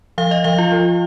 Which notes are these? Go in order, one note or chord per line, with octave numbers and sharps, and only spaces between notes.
F3 F5
D#5
F3 F5
F4
F3